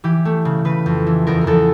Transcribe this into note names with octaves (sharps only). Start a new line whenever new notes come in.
E3 G4
A3
C#3
C#3 B4
F2
E3
E2 A#4
A#4
E2 A4